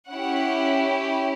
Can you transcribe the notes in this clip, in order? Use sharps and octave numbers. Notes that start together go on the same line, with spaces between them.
C#4 E4 G4 F#5